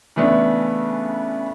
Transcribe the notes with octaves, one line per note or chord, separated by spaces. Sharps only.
C#3 E3 A3 B3 D4